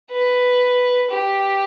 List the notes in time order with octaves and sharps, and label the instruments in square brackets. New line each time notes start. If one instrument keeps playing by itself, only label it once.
[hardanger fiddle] B4
G4